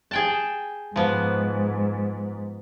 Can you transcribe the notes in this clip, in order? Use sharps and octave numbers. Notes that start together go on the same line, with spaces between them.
G#4 G5 A5
G#2 F3 B3